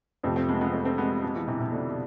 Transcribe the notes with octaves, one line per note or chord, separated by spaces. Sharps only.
F2 C3 F3 A3 C4
A3 C4
G#3 B3
G#3 B3
A3 C4
A3 C4
G#3 B3
G#3 B3
E3 G#3
C3 E3
C3
B2 D3
D3